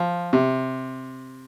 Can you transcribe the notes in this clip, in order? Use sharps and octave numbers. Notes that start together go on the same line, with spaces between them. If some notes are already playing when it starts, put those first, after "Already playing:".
Already playing: F3
C3